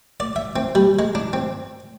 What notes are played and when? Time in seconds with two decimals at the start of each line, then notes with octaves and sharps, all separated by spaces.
0.20 D5
0.36 E5
0.56 C4
0.75 G3
0.99 G#3
1.15 D4
1.33 C4